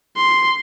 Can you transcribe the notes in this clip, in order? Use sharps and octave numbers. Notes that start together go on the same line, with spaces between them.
C6